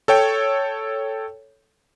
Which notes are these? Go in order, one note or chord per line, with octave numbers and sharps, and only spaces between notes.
A4 C#5 G5